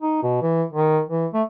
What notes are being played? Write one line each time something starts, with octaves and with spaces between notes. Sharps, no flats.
D#4
B2
E3
D#3
E3
A3